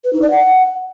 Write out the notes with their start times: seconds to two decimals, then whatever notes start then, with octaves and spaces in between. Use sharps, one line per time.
0.04 B4
0.13 D#4
0.22 D5
0.31 F#5